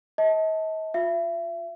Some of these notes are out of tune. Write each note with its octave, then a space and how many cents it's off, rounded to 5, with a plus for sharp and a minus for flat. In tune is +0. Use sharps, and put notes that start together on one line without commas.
D#5 +40 A5 +0
F4 +25 E5 +35